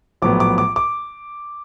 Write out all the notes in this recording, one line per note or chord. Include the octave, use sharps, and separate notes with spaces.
A#1 A2 F#3 B3 D6
D6
D6
D6